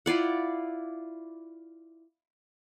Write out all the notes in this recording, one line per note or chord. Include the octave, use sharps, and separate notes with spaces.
E4 F4 D5 F#5